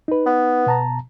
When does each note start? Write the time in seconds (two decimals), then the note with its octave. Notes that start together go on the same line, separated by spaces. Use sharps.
0.08 D#4 B4
0.26 B3
0.67 B2 A5 A#5